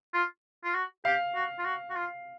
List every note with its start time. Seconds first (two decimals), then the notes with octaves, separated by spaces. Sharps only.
0.14 F4
0.64 F4
0.74 F#4
1.05 G4 F5
1.35 F#4
1.59 F4
1.65 F#4
1.90 F#4
1.96 F4